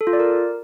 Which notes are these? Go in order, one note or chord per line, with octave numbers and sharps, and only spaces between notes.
A4
F4
D5
A#4